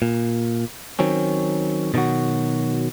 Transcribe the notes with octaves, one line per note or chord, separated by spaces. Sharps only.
A#2
D#3 F#3 C4 C#4
B2 D3 D#3 F#3 F#4